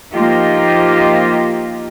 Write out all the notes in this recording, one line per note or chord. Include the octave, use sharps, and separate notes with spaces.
F3 A#3 D#4 F4 G4